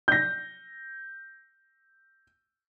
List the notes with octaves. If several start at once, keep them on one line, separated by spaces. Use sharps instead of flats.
G6 A#6